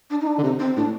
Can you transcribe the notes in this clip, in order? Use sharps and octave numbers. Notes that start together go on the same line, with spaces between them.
D4
D#4
D4
D3
C3 D#4
C4
A2 D4